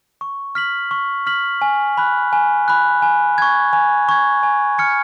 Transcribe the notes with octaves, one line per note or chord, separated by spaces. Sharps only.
C#6
F6 B6 F#7
C#6
F6 B6 F#7
G#5
B5 F#6
G#5
B5 F#6
G#5
C#6 G#6
G#5
C#6 G#6
G#5
C#6 F6 G#6 C#7